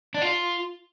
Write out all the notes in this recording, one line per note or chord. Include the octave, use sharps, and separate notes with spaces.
D4
F4